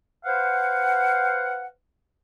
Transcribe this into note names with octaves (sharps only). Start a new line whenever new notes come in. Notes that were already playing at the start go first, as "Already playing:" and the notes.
B4 C5 F5 F#5